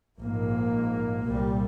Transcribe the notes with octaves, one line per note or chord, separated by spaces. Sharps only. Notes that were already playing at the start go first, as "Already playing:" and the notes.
A#1 G#2 A#3
C2 A#2 G3